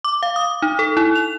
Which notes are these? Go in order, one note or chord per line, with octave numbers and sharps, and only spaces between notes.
D6
F5
D#6
D#4
A4
E4
F7